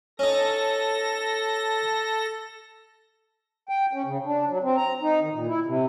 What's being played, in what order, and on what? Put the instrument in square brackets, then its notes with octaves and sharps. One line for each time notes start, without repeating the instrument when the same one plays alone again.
[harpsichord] C#4 D#4 [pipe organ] A4 A#6
[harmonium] G5
C#4
C#3
D4
F#3
C4
A#5
D#4
D#3
A#2
E4
C3